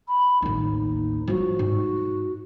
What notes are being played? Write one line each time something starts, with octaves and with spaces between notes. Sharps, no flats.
B5
A1 D#2 D#4
F3 F#3 F#4
G#2